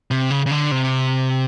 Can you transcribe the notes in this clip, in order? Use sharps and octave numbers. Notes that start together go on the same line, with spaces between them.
C3
C#3
C#3
D3
C3